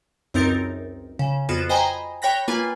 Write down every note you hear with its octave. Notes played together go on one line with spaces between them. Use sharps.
C#2 F#2 C4 D#4 A#4 A6
C#3
F2 B3 F4 F#4 E7
C5 D#5 G5 G#5 A#5 B5
C#5 G5 B5 F#6 A#6 B6
A#3 F4 B4 G#5